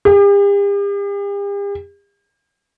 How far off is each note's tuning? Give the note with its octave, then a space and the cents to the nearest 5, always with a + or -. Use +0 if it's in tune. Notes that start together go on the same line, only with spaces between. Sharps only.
G4 +45